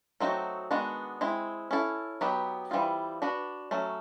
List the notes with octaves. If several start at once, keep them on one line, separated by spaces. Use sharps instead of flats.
F#3 A3 C4 D#4 F#4
D#3 G#3 B3 D4 F#4
G#3 C4 E4
C#4 E4 A4
F#3 B3 D#4 G4 B4
E3 G3 C4 F4
D4 F#4 B4
F#3 A3 C#4